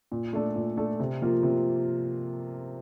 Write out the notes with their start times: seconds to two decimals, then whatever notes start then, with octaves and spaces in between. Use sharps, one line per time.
0.12 A#2
0.33 A3 D4 A4
0.56 A#2
0.77 A3 D4 A4
1.00 C3
1.21 F3 A#3 F4
1.43 C3